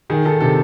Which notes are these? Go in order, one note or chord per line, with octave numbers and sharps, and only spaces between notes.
D#3 G#4
D#3 A4
C3 A4